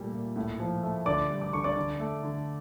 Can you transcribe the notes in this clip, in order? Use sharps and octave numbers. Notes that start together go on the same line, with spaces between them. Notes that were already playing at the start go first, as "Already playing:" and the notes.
Already playing: A#2 G3 A3
A#2
A2
F3
A3
D3 D5 D6
G3
D6
D3 C#6
D5 D6
D3
A3
D3